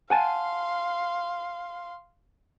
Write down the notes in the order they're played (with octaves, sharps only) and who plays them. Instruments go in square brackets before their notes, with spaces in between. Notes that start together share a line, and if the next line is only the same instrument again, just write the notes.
[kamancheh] F5 C6 [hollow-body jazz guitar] F#5 G#5 A5